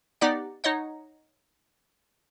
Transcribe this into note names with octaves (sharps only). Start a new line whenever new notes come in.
B3 D#4 G4 D5 F#5
D#4 C#5 D#5 F#5